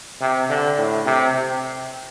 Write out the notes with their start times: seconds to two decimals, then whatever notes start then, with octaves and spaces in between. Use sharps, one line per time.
0.21 C3
0.50 D3
0.78 A2
1.06 C3
1.35 C3